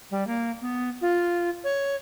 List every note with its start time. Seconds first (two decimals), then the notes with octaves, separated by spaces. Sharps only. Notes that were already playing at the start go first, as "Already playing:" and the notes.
0.11 G3
0.27 A#3
0.61 B3
1.01 F4
1.64 C#5